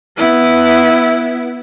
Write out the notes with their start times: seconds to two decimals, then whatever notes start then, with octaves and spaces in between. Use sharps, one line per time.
0.17 B3 E4